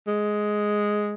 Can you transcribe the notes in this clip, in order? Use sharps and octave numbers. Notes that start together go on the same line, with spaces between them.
G#3